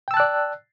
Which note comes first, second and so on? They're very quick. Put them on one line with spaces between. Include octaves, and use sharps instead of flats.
G5 E6 A5 F#6 D5